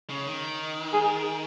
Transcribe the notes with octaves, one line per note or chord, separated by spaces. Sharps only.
C#3
D#3
G#4